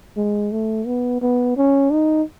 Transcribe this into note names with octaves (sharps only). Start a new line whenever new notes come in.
G#3
A3
B3
B3
C#4
D#4